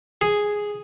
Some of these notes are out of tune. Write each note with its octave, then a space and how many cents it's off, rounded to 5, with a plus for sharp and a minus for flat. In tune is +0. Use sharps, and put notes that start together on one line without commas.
G#4 +0